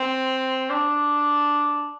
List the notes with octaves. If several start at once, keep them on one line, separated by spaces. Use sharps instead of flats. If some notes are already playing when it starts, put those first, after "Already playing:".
Already playing: C4
D4